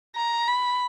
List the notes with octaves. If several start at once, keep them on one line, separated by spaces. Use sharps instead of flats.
A#5
B5